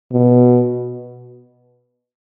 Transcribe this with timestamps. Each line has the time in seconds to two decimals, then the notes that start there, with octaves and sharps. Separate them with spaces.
0.12 B2